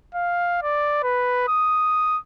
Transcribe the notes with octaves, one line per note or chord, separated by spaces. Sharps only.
F5
D5
B4
D#6